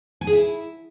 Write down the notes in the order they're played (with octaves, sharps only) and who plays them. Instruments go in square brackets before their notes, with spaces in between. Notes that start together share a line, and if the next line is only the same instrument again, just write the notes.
[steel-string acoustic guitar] G#5
G#4
E4